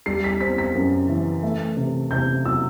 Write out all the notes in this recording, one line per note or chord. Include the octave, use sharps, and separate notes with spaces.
G3 C7
B6
C4 B6
B6
F#2
E3
A3
C3
C3 G6
F#3 E6